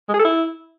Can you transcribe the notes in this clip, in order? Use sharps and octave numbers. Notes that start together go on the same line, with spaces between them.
G#3
G#4
A4
E4